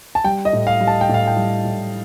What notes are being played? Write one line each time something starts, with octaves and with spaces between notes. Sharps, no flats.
A5
G3 G5
D#5
A2
F5
G3
A5
G5
A2
F5
G5
G3
A2